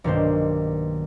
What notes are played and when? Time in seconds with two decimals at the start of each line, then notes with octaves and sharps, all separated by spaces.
0.04 B1 G2 D#3 A#3 D4 C5